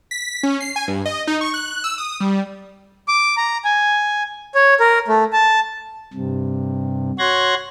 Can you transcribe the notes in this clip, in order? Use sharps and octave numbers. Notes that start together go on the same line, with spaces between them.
B6
C#4
C7
G#5
G2
D#5
D#4
C#6
F#6
E6
D#6
G3
D6
A#5
G#5
C#5
A#4
A3
A5
G2 C3
F#4 C#5 C6 F#6 G#6 A#6